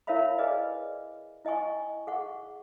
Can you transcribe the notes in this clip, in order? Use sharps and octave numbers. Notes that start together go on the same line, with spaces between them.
E4 A#4 C#5 E5 F5 B5
G#4 B4 D5 D#5 G#5
E4 D#5 G5 G#5 C#6
G#4 F#5 C#6